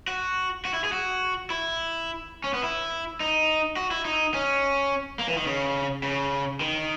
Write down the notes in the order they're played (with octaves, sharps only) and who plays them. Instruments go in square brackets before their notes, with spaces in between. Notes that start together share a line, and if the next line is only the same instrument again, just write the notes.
[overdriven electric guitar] F#4
F#4
E4
G#4
F#4
E4
C#4
B3
E4
D#4
F#4
E4
D#4
C#4
A#3
E3
D#3
C#3
C#3
D#3